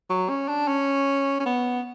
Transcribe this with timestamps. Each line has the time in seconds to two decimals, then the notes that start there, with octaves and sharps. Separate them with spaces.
0.10 F#3
0.29 C#4
0.49 D4
0.68 C#4
1.40 C#4
1.46 B3